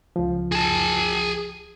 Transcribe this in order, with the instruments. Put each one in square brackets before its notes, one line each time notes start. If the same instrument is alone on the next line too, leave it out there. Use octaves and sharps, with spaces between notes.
[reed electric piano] C#2 F3
[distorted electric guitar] G#4 A5